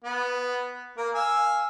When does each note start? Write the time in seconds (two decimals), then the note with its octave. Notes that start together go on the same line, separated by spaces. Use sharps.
0.04 B3
0.98 A#3 A#4
1.15 F5 G#5 E6